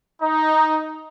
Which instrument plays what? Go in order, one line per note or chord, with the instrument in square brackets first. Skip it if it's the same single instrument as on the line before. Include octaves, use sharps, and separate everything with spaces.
[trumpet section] D#4